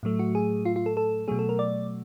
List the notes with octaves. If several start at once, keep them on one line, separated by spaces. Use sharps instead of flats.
A2 F#3 A3
F#4
G#4
F4
F4
A4
A4
B2 F#3 A3 G#4
A4
A#4
D5